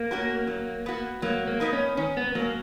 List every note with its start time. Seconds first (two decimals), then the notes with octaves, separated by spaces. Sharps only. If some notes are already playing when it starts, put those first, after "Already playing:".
Already playing: A#3
0.11 C#4 F#4 A#4
0.47 F#3
0.86 B3 F#4
1.22 F#3 A#3
1.48 A#3
1.60 B3 D#4 A#4
1.73 C#4
1.97 D#3 C#4
2.17 B3
2.35 F#3 A#3 C#4